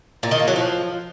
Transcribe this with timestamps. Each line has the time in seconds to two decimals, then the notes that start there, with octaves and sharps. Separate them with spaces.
0.23 A#2
0.31 D#3
0.39 A#3
0.48 F#3
0.56 F3